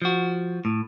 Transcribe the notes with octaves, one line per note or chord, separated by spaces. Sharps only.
F3 F#4
A2